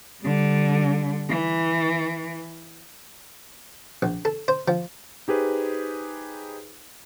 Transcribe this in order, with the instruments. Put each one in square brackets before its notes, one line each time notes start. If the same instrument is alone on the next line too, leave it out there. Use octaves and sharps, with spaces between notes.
[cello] D3 G3
E3
[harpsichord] A#1
A4
C5
F3
[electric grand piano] D#4 G4 G#4 B4 C5